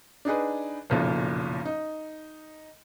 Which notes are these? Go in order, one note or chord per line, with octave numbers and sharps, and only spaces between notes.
D4 D#4 G#4 B4
F#1 B1 A#2 F3
D#4